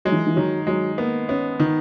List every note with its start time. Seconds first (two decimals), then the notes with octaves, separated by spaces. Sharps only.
0.05 F#3 G#3
0.12 E3
0.27 E3
0.36 D#3 F#3
0.67 F#3 G#3
0.98 A#3 B3
1.29 B3 C#4
1.59 D#3 D#4